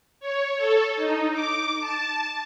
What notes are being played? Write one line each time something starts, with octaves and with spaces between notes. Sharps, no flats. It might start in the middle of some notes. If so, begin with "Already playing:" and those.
C#5
A4
D#4
D6
A5